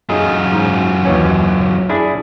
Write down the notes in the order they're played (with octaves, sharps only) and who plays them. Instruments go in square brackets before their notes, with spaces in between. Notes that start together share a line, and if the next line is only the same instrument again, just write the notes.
[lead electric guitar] F#2 F4 [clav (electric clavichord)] D#4 G#4 D#5
[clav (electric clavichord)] G#2
D#2 E3 C#4
D4 E4 G#4